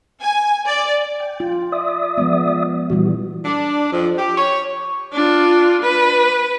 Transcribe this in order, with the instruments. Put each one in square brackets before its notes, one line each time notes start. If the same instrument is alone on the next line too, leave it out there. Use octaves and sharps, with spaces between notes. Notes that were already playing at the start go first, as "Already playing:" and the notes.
[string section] G#5
D5
[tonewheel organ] G5
[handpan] F4
[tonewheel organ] D5 E5 D#6
[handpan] F3 G#3 B3
[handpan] A#2 E3 G3 [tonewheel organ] F#4
[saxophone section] D4
F2
G4
C#5
[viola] D4 F4
B4